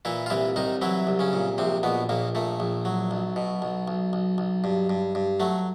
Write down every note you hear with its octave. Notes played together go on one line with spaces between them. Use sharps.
A#2 E3 E4
F4
C2 E3 E4
C2 D#3 D#4
E3 F#3 E4
C2
C#3 C#4
A#2
A#1 C3 C4
A#1 B2 B3
A#1 A#2 A#3
A#2 A3
A#1
F#3
B1
B2
B1
B1
B1
B1
G2
G2
G2
F#3 A3